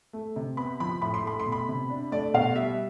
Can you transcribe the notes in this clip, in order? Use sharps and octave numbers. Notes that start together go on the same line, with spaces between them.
A3
C3
B3 B5
F3 B5
A2 B5
C6
A3 B5
C6
B2
B5
C3
D4
A3 D5
B2 F5
G3 E5